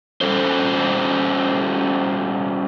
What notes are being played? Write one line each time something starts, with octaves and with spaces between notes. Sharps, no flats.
G3 C#4 A4 C5